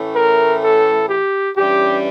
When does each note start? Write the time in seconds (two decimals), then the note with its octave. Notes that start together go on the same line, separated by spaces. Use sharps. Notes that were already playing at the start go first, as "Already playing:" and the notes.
Already playing: A2 E3 A3 C#4
0.16 A#4
0.64 A4
1.09 G4
1.56 G2 E3 G3 C#4 G4